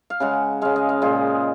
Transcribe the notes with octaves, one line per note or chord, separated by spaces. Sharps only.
F5
C#3 G#3 F#5
C#3 G#3 F5
D#5
F5
A#2 G#3